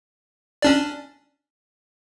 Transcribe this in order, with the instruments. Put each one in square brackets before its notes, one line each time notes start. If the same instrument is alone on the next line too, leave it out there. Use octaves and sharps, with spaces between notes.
[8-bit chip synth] C#4 D4 D5